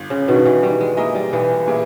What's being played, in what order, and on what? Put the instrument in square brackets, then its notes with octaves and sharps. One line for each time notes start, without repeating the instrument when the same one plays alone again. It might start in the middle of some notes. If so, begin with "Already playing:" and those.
Already playing: [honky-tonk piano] G1
[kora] C#3
[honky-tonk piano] G2 D#3 [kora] B2
[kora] E3
[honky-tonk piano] D#3 [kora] G3
[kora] G#3
[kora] G#3 [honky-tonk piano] A#3 E4 A#4 D#5
[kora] G3
[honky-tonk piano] B1 [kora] E3
[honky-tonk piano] A#2 A#3 E4 G#4